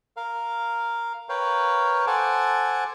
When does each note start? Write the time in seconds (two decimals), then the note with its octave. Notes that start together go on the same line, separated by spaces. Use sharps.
0.17 A#4 F5
1.29 A#4 B4 C#5 F5 G5
2.07 A4 C5 F#5 G#5 A5 D6